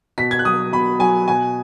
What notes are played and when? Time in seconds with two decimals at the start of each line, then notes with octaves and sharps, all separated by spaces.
0.18 B2 B6
0.31 G#6
0.39 F#6
0.45 F#3 D#6
0.72 B2 B5
0.99 F#3 G#5
1.27 B2 G#5